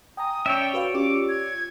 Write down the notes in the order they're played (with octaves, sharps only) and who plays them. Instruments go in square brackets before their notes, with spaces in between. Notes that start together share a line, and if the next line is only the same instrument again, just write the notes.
[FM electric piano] G5 G#5 A#5 [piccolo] D#6
[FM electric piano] C#4 [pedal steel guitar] C#5 D5 E5 [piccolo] G5
[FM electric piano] F#4 B4 F5
[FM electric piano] C#4 F4 G4 [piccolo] D6
[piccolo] G#6